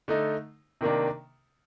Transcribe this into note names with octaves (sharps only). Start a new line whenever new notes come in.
D3 A3 D#4
C3 D#3 A#3 D4